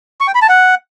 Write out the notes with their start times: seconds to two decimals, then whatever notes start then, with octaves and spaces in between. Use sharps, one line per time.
0.21 C#6
0.28 G5
0.35 B5
0.42 A5
0.49 F#5